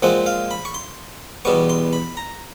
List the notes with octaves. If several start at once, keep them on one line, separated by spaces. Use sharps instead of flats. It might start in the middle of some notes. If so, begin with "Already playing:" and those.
A#2 F3 G#3 C4 F#5
F5
B5
C#6
C6
E2 B2 G3 B3 C#6
C6
B5
A#5